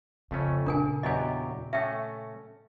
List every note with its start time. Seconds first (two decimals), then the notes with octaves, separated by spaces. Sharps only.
0.31 F2 C#3 A3 C#4
0.66 A#2 C#3 D4 A#4 G#5
1.03 E2 F#3 G4 D#5 G#5
1.73 A3 C#4 E5 G5